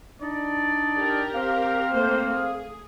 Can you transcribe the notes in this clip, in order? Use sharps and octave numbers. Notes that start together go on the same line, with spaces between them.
D4 D#4 D5
G4 A#4
C4 F5
A3 A#3 C5
G#4